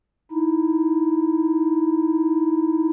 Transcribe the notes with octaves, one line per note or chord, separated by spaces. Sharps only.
D#4 E4